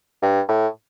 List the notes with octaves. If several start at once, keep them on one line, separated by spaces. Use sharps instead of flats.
G2
A2